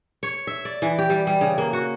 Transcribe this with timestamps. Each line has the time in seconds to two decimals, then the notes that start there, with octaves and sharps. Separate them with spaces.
0.23 C#5
0.47 E5
0.65 D5
0.82 E3
0.99 G4
1.10 G3
1.27 G3
1.41 C#3
1.58 A#3
1.73 F#4